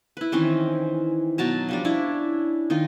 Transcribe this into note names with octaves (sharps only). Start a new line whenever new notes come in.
E4 B4
D#3 E3 C4 C#4
B2 F#3 A5 A#5
F3 G3 D4
C#4 D4 E4 C#5
D#3 D#4 F4